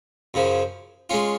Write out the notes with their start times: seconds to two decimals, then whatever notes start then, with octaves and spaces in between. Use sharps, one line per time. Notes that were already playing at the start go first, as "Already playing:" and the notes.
0.34 F#2 C#3 F3
1.10 G#3 C#4 F4